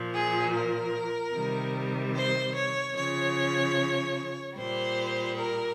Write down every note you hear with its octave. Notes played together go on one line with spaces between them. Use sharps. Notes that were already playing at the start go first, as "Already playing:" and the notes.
Already playing: A#2 F3
G#4
A#4
C3 D#3 G3
C5
C#5
C#3 F3 C#5
A#2 G3 C5
A#4